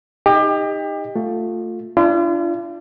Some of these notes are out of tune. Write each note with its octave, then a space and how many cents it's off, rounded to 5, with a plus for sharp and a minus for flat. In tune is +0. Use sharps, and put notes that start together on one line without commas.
D#4 +0 G4 +30 D#5 +0
A3 +15 F4 +20
D4 +0 F4 -40